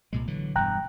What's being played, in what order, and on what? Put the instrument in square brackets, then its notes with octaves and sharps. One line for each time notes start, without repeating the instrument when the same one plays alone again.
[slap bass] C2 A#2 G#3
D3 E3 F#3
[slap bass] E1 G2 [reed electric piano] G5 A#5 F#6